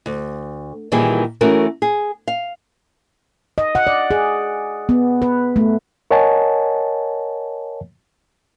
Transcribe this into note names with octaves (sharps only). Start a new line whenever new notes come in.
D2
A#2 D#3 E3 G3 A#3 G#4
E3 A3 C#4 F#4 A#4
G#4
F5
D#5
F#5
D5
G#4
B3
B4
A3
A#4 C#5 D#5 F#5 G#5 A5